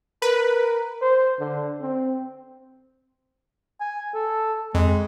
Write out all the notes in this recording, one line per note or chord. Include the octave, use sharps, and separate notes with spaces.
A#4 B4
C5
D3
C4
G#5
A4
F2 G#3